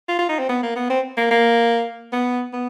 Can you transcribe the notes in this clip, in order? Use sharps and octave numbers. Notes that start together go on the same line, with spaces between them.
F4
F4
D#4
C4
B3
A#3
B3
C4
A#3
A#3
B3
B3